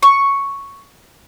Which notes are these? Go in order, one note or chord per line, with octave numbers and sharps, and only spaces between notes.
C#6